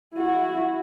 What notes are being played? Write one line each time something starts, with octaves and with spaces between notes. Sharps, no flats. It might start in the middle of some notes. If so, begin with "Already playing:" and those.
E4 F#4